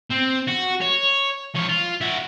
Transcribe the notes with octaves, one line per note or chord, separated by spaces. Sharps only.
C4
F#4
C#5
F3 C#5
F4
E4 F#4